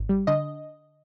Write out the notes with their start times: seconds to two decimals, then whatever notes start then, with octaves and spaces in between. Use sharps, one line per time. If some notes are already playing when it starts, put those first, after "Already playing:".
Already playing: G#1
0.09 G3
0.27 D3 D#5